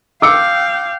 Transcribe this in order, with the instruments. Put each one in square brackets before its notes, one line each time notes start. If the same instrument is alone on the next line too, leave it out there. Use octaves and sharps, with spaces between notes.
[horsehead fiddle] F5 G5 [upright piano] D6 E6 C#7